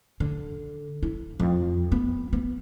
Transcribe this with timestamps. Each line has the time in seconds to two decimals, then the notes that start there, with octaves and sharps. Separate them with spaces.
0.20 D3
1.03 E4
1.40 F2
1.92 B3
2.33 B3